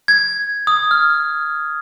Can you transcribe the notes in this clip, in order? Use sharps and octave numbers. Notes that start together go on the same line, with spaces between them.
G#6
D#6
F6